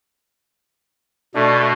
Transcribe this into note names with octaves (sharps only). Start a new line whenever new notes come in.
B2 A3 D4